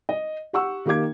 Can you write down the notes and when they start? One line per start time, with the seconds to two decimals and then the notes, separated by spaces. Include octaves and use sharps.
0.09 D#5
0.53 G4 F#5 C#6 E6
0.86 D#3 A#3 G4 F5 D6 G#6